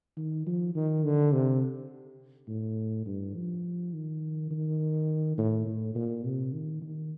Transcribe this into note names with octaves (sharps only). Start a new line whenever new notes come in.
D#3
F3
D#3
D3
C3
A2
G2
F3
D#3
D#3
A2
A2
A#2
C3
D#3
D#3